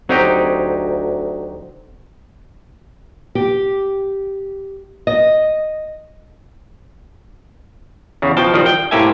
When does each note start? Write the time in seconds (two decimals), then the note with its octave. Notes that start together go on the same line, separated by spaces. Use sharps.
0.09 D2 F#3 C4 D#4 G4
3.35 G4
5.07 D#5
8.22 E2 C#3
8.37 B2 F3 G5 A5
8.54 D#3 F3 G3 C4
8.66 G5
8.91 A2 C3 A#3 G4 E5 G#5